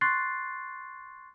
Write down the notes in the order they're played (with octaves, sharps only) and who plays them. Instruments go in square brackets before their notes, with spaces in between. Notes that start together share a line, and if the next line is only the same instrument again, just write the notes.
[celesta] C6 C#6 F#6 A6 C7